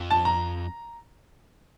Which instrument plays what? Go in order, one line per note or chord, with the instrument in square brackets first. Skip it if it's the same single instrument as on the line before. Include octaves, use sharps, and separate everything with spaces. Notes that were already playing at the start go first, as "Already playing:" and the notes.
Already playing: [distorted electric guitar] F2
[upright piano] A5
A#5